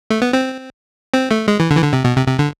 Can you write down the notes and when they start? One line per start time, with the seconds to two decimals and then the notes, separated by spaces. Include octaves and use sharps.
0.10 A3
0.22 B3
0.33 C4
1.14 C4
1.31 A3
1.48 G#3
1.60 E3
1.71 D3
1.77 E3
1.82 D3
1.93 C3
2.04 B2
2.17 C3
2.27 C3
2.39 D3